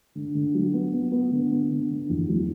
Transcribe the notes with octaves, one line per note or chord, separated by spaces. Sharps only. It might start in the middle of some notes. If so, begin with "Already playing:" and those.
D3
D3
F#3
B3
B3
B3
D3
B3
D3
D3
E2
F#3